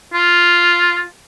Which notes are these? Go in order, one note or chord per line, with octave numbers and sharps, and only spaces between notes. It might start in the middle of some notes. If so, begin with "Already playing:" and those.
F4